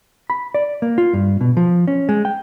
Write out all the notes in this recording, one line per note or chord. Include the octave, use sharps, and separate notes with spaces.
B5
D5
A#3
F4
G2
B2
F3
C#4
G#3
G5